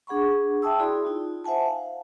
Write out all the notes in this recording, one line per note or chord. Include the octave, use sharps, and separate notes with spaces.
D4 G#4 F#5 B5 C#6
E5 G5 A5 D#6 E6
E4 F#4 G#4 D5 B5 C6
D#4 F4
C5 E5 F#5 G#5 A5
F5